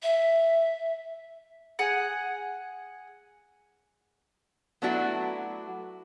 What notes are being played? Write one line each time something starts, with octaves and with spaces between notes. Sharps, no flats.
E5
G#4 F#5
F#3 A3 B3 D4 E4 F#4